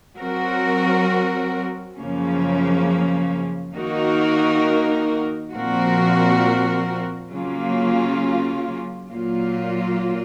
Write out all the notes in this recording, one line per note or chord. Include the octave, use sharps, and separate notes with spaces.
F#3 C4 F#4 A#4
F#2 C#3 F3 A#3 C#4
D#3 A#3 D#4 F#4 A#4
A#2 F3 C4 F#4 A#4
C#3 F#3 A#3 C#4 F4
A#2 F#3 A#3 F4